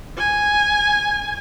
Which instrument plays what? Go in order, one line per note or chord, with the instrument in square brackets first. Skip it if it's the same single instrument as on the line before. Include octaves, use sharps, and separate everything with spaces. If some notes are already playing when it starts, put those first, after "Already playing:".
[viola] G#5